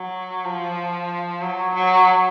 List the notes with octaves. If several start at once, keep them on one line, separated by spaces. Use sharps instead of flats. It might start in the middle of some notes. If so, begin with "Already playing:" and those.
Already playing: F#3
F3
F#3
F#3